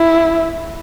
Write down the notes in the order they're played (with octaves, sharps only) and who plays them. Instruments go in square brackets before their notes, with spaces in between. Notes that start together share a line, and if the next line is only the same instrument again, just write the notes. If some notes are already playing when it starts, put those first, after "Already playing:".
Already playing: [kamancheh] E4